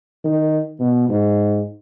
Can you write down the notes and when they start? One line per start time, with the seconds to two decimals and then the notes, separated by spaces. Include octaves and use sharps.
0.25 D#3
0.80 B2
1.09 G#2